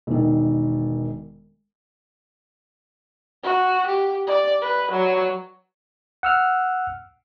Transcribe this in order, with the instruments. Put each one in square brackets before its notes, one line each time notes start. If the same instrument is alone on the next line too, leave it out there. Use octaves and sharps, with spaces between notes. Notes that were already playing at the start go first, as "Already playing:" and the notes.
[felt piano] E1 D#3
[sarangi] F#4
G4
D5
B4
F#3
[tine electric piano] F#5 E6 F6